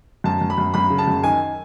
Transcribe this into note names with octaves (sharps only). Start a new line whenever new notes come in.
F#2 A5
F#2
B5
F#2
F#2 B5
C#3
A5
F#2
D#3 G#5